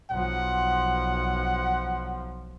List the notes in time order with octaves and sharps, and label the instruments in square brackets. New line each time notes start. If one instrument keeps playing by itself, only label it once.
[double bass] B1 F3 [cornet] F#5